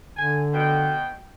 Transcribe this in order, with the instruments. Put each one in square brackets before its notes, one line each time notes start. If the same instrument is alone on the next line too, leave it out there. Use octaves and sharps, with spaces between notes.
[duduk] D3 [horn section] G#5
[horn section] B2 G5